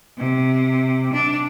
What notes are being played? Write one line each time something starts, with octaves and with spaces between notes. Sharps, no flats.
C3
D4